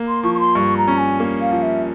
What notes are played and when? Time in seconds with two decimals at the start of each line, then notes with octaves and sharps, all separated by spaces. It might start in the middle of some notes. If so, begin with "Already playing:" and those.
Already playing: A#3
0.08 C6
0.23 F3 C#6
0.35 C#6
0.40 C6
0.55 G2 C#6
0.77 A#5
0.88 C#4
0.98 G#5
1.20 A#3
1.40 F5
1.51 F3
1.62 E5